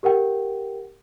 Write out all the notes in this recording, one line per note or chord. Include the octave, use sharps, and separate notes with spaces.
G4 A#4 F#5 G5